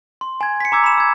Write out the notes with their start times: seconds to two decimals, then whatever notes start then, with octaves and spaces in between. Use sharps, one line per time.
0.21 C6
0.41 G#5 G#6
0.60 B6 C#7
0.72 A#5 D6 E6 G#6
0.84 B5 E7
0.98 E6 G#6